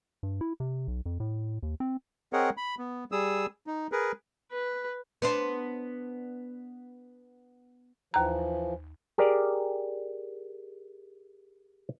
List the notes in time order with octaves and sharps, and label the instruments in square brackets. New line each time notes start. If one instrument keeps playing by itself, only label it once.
[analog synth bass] G2
E4
C3
B1
F2
A2
D#2
C4
[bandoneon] C4 G#4 A#4 C#5 D#5 F#5
B5
B3
G3 G#4 D#6 E6
D#4
G#4 A#4 B4
[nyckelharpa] B4
[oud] B3 D4 C5
[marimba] D#2 A#5 [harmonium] E3 F3
[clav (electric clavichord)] G4 G#4 A#4 D5